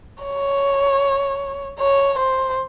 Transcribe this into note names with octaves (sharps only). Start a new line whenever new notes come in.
C#5
C#5
C5